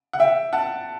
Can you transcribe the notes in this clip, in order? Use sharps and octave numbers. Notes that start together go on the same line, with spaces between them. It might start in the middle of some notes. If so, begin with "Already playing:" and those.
F#5
E5 G5
F#5 A5